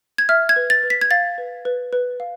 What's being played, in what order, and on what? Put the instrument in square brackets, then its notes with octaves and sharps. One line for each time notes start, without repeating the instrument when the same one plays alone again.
[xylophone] G#6
E5 F6
G#6
B4
A6
B4
B6
G#6
F5 A6
B4
B4
B4
F5